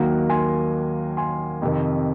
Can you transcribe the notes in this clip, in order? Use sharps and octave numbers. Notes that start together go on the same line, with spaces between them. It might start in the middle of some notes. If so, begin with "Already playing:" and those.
Already playing: D#2 D#3 F#3 A#3 F#5 A#5
G#5 C6
G#5 C6
F2 C3 D#3